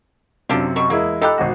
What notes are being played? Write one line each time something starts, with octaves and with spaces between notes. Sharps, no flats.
F#2 C3 F3 D4 F4
B2 F#3 C#6
E2 G#3 A#3 E4
D#4 F4 G4 A4 B5 F#6
G#1 B2 F#4